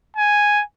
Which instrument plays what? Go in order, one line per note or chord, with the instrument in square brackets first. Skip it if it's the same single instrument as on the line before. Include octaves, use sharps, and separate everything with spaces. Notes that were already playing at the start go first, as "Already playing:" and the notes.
[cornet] G#5